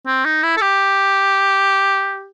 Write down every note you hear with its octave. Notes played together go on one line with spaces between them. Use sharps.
C4
D#4
E4
A4
G4